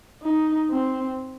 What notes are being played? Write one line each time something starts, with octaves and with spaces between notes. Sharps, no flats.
D#4
C4